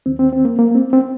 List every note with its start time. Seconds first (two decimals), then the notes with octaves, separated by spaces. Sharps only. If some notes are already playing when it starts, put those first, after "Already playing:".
0.06 D#2 D#3 C4
0.19 C4
0.32 C4
0.45 A#3
0.59 A#3
0.71 A#3
0.75 C4
0.93 C4